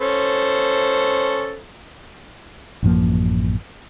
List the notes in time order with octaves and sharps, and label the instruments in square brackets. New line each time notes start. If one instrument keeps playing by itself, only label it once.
[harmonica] C#4 A4 C5
[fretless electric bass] A1 F#2 F3 A#3